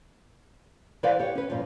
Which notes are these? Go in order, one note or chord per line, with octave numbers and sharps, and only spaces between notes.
E3 E4 B4 C5 D5 F5
G4 C#5
C#4 B4
G2 A#2 F3